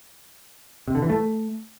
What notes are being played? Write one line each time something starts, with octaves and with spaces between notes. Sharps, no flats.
C3
D3
E3
A3